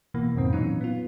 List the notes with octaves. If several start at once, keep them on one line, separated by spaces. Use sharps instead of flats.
B2 E3 A#3
F2 G#2 B2 D#3 C4
A#2 E3 F#3 C#4 D#4
B3 F4